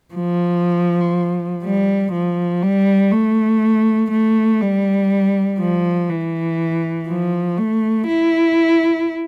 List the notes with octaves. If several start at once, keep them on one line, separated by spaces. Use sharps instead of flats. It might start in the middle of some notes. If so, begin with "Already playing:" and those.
F3
G3
F3
G3
A3
A3
G3
F3
E3
F3
A3
E4